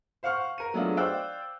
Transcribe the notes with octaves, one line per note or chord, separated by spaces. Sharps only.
C5 F5 F#5 C#6 F6
A#4 D#7
F#3 G#3 A3 B3 D4 F4
C5 D5 F5 G5 E6 F#6